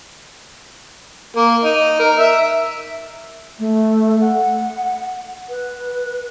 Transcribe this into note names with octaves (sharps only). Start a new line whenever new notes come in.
A#3
D#4
A#4
E5
A3
F#5
B4